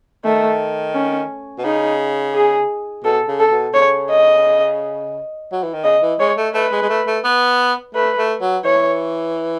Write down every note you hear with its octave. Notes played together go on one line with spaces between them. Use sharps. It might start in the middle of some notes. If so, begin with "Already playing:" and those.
D#3 A3
C#4
B2
C#3 D#4
G#4
B2 A4
C#3
A4
B2
C#3 C#5
D#5
F#3
E3
D#3
C#3 D#5
E3
G#3 C#5
A3
A3 B4
G#3
G#3
A3
A3
B3
A3 B4
A3
F#3
E3 C#5